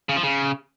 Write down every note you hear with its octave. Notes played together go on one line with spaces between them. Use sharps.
C#3
F3
C#3